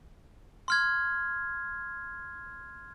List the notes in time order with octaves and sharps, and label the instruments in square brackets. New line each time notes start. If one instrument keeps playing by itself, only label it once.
[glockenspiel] C6 F6 G#6